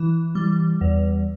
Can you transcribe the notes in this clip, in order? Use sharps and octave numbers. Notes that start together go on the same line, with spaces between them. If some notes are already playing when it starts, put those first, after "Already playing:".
Already playing: E3
G3
E2